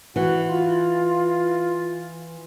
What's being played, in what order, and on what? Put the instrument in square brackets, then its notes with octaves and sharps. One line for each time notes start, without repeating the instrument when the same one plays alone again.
[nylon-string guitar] E3 [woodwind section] F#4 F#5
[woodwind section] F4